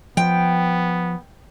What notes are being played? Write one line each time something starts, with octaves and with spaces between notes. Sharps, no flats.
F3 B3 G5